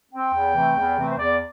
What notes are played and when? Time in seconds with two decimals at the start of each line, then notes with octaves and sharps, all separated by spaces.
0.12 C4 G5
0.34 E2
0.55 C3 E3 A3 C4
0.76 E2
0.98 C3 E3 A3 C4
1.10 C5
1.19 E2 D5